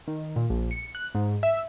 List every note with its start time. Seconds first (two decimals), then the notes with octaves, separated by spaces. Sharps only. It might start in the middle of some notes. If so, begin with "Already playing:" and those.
0.08 D#3
0.36 A#2
0.50 A#1
0.71 C#7
0.95 F#6
1.15 G#2
1.43 E5